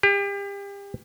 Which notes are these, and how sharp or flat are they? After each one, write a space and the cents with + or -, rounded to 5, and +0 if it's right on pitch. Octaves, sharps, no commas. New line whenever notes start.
G4 +35